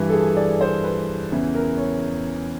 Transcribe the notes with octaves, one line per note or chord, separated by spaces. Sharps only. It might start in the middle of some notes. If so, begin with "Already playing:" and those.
Already playing: G2 E3
A4
G#4
D5
C5
B4
E2 C#3 E3
A#4
C#5